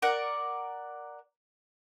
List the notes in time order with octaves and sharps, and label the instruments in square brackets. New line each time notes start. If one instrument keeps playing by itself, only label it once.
[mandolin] A#4 D5 F#5 A#5